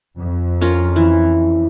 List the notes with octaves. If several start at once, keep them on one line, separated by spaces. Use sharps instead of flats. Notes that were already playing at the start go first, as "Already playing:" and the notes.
F2
C#4 F4 A#4
E3